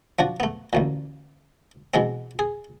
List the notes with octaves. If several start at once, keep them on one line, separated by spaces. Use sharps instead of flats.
F3 D4 F#4
A3 B3
A1 D2 A#2
B2 E3 G#3 C4
G#4